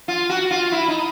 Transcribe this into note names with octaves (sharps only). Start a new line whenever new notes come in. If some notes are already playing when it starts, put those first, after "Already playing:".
F4
F#4
F4
E4
D#4